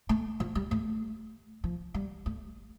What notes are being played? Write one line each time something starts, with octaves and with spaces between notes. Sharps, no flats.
A3
F3
G3
A3
F3
G3
A3